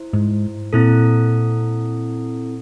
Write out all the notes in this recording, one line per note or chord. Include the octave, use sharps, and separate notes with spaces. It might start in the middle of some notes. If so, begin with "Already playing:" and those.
Already playing: E4 C5
G#2
A#2 C4 E4 A4